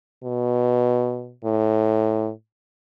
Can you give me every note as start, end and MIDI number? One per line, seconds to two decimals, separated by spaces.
0.24 1.35 47
1.44 2.30 45